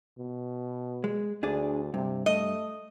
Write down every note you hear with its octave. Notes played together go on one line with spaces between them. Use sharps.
B2
G#3
D2 D4 G#4 D5
G2 C3
A3 D#5